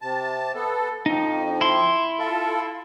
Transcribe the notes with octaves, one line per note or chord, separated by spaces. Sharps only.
C3 A5
B3 A4
F2 F3 D#4
E4 C6
F4 A4